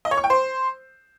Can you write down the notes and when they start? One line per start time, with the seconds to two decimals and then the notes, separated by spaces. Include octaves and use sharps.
0.05 D#5
0.11 C#5
0.18 C#6
0.24 G5
0.30 C5